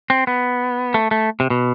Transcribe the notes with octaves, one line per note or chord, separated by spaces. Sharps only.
C4
B3
A3
A3
C3
B2